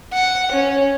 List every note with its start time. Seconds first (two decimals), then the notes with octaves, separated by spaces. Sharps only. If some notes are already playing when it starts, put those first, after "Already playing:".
0.13 F#5
0.52 C#4